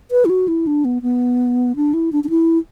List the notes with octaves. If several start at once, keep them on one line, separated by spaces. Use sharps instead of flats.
B4
E4
F#4
E4
D4
B3
B3
D4
E4
D4
D4
E4